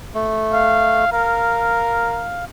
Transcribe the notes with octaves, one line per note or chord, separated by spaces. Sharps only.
A3
F5
A#4 F5